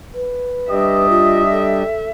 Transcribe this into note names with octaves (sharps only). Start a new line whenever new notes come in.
B4
G3 D4 G4 D#5 E5
F4
A4